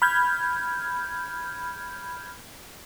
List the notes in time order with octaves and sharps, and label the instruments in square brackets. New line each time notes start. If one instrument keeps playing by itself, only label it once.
[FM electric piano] B5 F6 G6 G#6